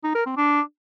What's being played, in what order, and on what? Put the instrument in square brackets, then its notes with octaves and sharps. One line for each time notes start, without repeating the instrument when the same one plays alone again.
[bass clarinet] D#4
A#4
C4
D4